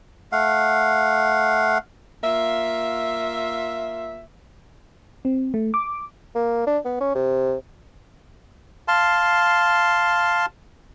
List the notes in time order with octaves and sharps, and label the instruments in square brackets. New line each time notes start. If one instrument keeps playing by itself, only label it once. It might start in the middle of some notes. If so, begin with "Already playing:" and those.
[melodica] A3 F5 F#5
[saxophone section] A#3 F4 E5
[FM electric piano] C4
A3
D6
[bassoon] A#3
D4
B3
C#4
C3
[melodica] F5 A5 C6